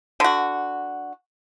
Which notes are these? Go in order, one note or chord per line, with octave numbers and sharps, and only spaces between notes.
D3 F#4